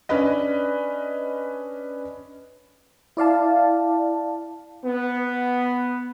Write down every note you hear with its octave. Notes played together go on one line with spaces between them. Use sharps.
C#4 D4 B4 D#5
E4 D5 F5 A5
B3